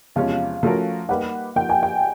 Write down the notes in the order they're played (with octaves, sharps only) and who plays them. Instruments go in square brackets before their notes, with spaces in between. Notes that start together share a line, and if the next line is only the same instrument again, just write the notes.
[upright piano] E2 C3 F3 G#3 C#4 [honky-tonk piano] F5
[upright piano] F3 A3 C#4 F#4 A#4
[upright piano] G3 A#3 D#4 G4 B4 [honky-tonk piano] F#5
[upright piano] F3 A#3 D#4 [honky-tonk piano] G5
[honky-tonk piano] G#5
G5